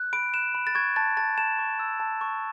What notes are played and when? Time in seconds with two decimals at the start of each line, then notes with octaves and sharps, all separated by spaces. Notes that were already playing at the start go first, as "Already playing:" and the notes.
Already playing: F#6
0.13 B5 D7
0.34 F#6 E7
0.55 B5
0.67 A6
0.75 C#6 G#6
0.96 A5 A6
1.17 A5 A6
1.38 A5 E7
1.59 C#6
1.79 E6
2.00 A5
2.21 C#6